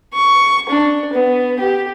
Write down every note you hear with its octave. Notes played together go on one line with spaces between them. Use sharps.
C#6
D4
B3
G4